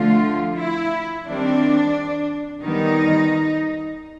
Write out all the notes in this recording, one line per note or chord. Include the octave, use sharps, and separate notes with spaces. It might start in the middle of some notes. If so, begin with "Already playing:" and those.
Already playing: D3 F3 A3 F4
E4
D#3 G3 C4 D4
D#3 G3 B3 D#4